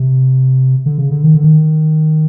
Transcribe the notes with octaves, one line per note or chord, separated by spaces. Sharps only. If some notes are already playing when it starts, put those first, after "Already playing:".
Already playing: C3
D3
C#3
D3
D#3
D3
D#3